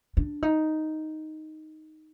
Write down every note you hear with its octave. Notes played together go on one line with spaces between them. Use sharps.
D4
D#4